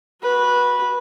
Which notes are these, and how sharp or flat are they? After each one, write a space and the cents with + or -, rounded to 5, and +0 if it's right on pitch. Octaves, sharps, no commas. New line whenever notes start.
F#4 +0 B4 -15